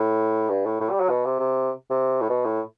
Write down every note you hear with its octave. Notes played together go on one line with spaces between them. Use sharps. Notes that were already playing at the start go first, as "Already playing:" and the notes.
Already playing: A2
G2
A2
A2
G3
F#3
B2
C3
C3
C3
A2
B2
A2